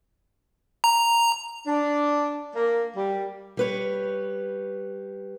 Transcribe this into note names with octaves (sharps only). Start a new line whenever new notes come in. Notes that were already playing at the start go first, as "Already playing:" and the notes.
A#5
D4
A#3
G3
G3 B4 C#5